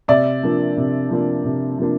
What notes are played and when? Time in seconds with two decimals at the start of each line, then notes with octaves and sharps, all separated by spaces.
0.08 C3 D5 E5
0.43 F3 A#3 D4
0.77 C3
1.10 F3 A#3 D4
1.45 C3
1.78 F3 A#3 D4